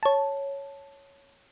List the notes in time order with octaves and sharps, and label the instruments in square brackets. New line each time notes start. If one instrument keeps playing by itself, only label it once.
[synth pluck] C#5 A5